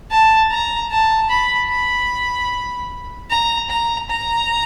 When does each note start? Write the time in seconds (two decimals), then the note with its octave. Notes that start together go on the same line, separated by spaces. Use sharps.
0.10 A5
0.50 A#5
0.91 A5
1.29 B5
1.70 B5
3.30 A#5
3.70 A#5
4.10 A#5